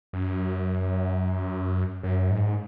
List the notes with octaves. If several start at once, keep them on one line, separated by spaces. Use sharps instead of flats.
F#2
F#2
G#2